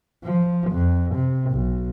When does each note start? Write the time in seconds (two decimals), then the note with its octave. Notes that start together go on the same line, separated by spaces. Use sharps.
0.24 F3
0.71 F2
1.15 C3
1.51 B1